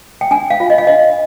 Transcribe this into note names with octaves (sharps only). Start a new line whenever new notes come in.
G5
D4 G#5
F5
F4
D#5
F5
D4 D#5